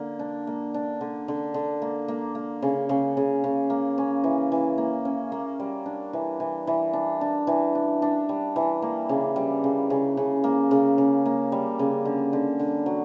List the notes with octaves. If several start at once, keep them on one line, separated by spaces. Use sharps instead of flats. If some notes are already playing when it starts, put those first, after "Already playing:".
Already playing: D3 A#3
D4
A#3
D4
D3
D3
D3
A#3
A#3
A#3
C#3
C#3
C#3
C#3
A#3
C#4
E3
E3
A#3
C#4
A#3
G3
D4
E3
E3
E3
D4
D4
E3
D4
D4
G3
E3
A#3
C#3
G3
C#3
C#3
C#3
A#3
C#3
C#3
A#3
G3
C#3
D3
D3
D3
F#3